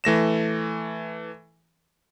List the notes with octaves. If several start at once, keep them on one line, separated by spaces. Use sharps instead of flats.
E3 A3 A#6 E7